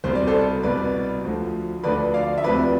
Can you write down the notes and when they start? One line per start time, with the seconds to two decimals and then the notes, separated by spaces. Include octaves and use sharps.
0.04 C2 B2 C5
0.15 D5
0.27 A4 C5
0.63 C2 B2 B4 D5
1.24 D2 D3 F3
1.84 D2 D3 F3 B4 D5
2.14 D5 F5
2.38 E5
2.44 D2 C3 F3 B4 D5